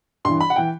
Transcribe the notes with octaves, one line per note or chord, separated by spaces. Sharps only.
G2 E3 C6
B5
F#5
E3 G5